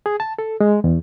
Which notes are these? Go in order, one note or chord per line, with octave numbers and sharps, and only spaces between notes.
G#4
A5
A4
G#3
E2